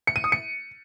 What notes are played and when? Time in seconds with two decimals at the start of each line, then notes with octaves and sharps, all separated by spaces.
0.07 C#7
0.16 D#7
0.24 D#6
0.32 C#7